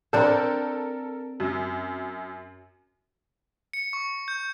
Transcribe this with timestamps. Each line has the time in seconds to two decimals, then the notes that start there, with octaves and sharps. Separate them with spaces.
0.13 C4 D4 A4 A#4 C5
1.40 F#2
3.73 C#7
3.93 C#6
4.28 G6